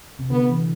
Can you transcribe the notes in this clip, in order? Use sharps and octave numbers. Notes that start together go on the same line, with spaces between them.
C3
D3 B3
E3